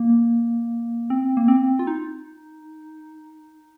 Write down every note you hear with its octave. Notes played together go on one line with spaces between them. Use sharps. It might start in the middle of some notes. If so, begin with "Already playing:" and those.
Already playing: A#3
C4
A#3
C4
F4
D#4